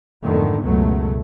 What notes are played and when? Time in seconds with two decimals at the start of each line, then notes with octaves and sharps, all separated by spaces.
0.24 F2 G#2 D3 D#3 A3 B3
0.63 C#2 F#2 B2 F#3 A3